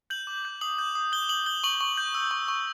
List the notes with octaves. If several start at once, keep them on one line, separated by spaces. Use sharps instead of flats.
G6 F#7
D6
G6
D#6 F#7
G6
D#6
G6 G7
D#6 F#7
G6 G7
C#6 F#7
C#6
G6
E6
C#6
C#6